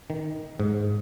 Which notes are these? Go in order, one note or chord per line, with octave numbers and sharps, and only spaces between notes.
D#3
G#2